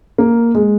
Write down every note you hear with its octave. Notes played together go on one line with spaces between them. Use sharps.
A#3
G#3